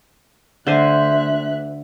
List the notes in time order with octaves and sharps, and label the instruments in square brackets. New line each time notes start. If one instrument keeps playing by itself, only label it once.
[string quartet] D2 E5 F#6 [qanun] D3 C5 G#5